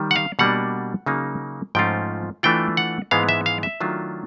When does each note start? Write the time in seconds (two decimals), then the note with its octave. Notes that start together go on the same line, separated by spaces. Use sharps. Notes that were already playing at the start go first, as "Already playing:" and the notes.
Already playing: D#3 G3
0.11 F#5
0.16 F5
0.39 B2 G3 A#3 D4 F#5
1.06 C#3 F#3 A#3 D#4
1.75 G#2 F3 A3 C#4 F4 G5
2.43 E3 A3 D4 F4 G5
2.77 F#5
3.11 G#2 E3 G#3 B3 F5
3.29 E5
3.46 F5
3.63 E5
3.81 D#3 F#3 A3 D4 F4